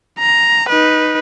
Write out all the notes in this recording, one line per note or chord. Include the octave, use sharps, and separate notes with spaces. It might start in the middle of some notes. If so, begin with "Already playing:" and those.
A#5
D#4 B4